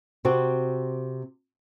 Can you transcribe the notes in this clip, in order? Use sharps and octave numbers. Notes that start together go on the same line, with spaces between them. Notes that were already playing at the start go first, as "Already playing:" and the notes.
C3 C4 F#4